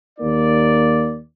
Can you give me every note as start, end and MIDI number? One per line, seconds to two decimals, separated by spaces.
0.19 1.19 39
0.19 1.19 58
0.19 1.19 63
0.19 1.19 74